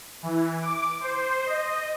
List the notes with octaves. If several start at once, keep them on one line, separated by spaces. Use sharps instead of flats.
E3
D6
C5
D#5